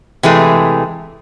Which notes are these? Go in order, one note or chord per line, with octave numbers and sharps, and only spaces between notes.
C3 E3 G#3 A3